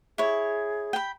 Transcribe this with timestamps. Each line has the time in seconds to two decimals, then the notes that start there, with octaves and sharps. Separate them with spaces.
0.18 E4 G#4 C#5
0.93 G5 B5